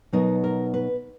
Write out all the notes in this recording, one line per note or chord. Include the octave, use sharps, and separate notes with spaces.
B2 F#3 B3 D#4 A#4
A#4
B4